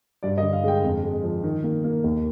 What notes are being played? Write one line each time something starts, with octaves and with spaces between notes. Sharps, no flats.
G2 D5
D#5
D3
F5
G#3 G5
F2
G#3
F3
D#3
A#3
A#3
D#2